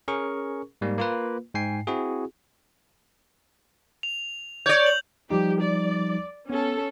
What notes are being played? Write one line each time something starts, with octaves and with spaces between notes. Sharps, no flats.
C#4 G#4 A#4 C#6
G#2 G3 A#3
A#3 F4 B4
G#2 G5 G#5 C7
C4 E4 F#4 G#4
F7
C#5 D5 G6
F#7
F3 G3 D#4 G4
D5
B3 C#4 A4